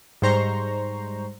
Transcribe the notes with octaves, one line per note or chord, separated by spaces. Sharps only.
G#2 G3 C5 A#5 C#6 C7